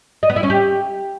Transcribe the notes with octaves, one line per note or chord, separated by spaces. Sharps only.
D#5
B3
E4
C#4
G4